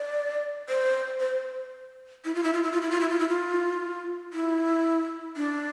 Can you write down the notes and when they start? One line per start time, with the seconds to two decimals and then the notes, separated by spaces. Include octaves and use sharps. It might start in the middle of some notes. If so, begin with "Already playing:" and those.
Already playing: D5
0.69 C5
1.20 C5
2.25 E4
2.35 F4
2.44 E4
2.53 F4
2.63 E4
2.72 F4
2.82 E4
2.91 F4
3.01 E4
3.09 F4
3.19 E4
3.29 F4
4.33 E4
5.37 D4